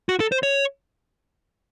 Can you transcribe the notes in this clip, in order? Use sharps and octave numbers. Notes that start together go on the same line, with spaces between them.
F#4
A4
C5
C#5